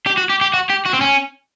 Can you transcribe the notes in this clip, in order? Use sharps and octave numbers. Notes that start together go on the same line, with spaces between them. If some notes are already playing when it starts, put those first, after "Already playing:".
G4
F#4
G4
G4
F#4
G4
F#4
C4
C#4